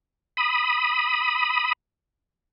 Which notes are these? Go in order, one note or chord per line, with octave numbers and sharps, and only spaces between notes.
B5 D#6